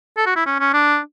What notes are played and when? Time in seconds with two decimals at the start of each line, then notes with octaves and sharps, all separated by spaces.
0.17 A4
0.26 F#4
0.36 E4
0.46 C#4
0.60 C#4
0.73 D4